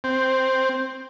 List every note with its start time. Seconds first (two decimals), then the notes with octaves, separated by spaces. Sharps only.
0.04 C4